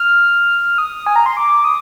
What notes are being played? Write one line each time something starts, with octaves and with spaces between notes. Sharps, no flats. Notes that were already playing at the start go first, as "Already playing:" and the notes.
Already playing: F6
D#6
G#5
A#5
C6
D6
D#6